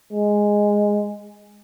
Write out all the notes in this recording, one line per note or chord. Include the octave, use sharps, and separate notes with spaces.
G#3